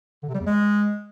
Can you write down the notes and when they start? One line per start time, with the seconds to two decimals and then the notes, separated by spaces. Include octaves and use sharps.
0.23 D3
0.29 C3
0.35 G3
0.40 E2
0.46 G#3